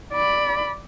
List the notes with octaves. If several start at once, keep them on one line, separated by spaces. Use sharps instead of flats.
D5 B5